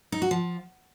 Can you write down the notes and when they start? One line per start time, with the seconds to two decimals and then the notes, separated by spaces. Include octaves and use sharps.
0.12 D#4
0.22 F#4
0.31 F3